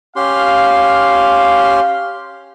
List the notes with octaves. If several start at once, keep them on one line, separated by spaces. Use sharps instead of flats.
C#4 G4 F5 C6